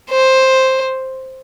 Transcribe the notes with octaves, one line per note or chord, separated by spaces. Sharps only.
C5